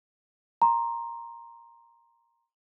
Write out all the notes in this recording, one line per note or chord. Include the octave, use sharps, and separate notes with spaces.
A#5 C6